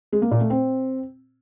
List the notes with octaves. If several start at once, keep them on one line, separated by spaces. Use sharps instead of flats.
G#3
A#3
A#2
A3
C4